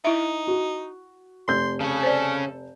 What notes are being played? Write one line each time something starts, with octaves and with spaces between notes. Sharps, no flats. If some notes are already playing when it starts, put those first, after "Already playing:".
D#4 E4 E5
F#4
F1 C6 G6
C#3 C#4 A4
C5 D5